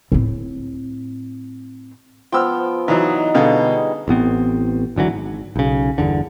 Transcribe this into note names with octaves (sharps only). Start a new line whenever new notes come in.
A2 C4
F3 B3 G5 E6 F6
E3 F#3 D#4 D5 D#5
B2 D3 G3 G#4 F5
A1 A2 B3 C4
G#1 D3 E3 F#3
G#1
B1 C#3
G1 E2 D3